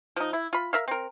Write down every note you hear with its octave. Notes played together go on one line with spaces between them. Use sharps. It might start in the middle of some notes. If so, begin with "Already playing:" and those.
F3 D#4
E4
F4 B5
A#4 E5 F5
C4 A#4